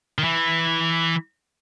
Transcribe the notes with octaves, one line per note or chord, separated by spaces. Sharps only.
D#3
E3